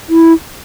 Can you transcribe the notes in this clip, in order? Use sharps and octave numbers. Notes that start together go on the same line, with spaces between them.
E4